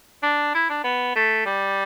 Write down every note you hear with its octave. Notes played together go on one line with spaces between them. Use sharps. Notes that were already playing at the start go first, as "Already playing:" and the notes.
D4
E4
D4
B3
A3
G3